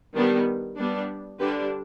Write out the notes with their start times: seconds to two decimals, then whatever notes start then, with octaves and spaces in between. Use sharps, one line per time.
0.16 D#3 G3 B3 D4
0.78 G3 B3 D4
1.40 D3 G3 D4 G4 B4